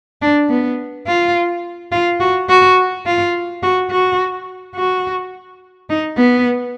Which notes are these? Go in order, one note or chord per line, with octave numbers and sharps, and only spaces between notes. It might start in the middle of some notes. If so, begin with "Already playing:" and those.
D4
B3
F4
F4
F#4
F#4
F4
F#4
F#4
F#4
D#4
B3